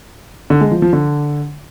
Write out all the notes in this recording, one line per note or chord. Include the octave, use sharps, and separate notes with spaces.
D3
G#3
F3
F3
D3